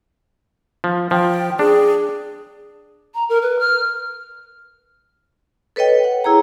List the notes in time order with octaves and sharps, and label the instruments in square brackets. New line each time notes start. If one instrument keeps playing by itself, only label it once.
[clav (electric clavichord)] F3
[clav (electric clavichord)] F3 [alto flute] G5
[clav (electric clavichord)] D4 [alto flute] G#4
[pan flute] A#5
A#4
B4
F6
[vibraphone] A4 B4 C#5 D#5 G5
F#5
E4 G#4 C#5 A#5